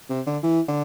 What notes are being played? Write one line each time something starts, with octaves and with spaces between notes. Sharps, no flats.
C3
D3
E3
D3